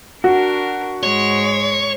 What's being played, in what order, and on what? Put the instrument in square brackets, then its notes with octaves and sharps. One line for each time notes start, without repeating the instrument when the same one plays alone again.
[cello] D4 A#4 [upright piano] F#4
[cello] G#2 G#3 [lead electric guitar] C#5